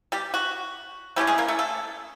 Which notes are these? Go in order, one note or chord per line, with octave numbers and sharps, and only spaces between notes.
G3 G4
F#4
F#3 G3 A3 C#4 E4 G4
G#3 G#4
A#3 A#4
A3 A4
A3 A4